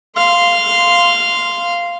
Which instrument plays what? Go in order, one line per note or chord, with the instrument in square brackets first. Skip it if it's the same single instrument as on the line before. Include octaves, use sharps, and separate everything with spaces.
[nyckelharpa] F5 C6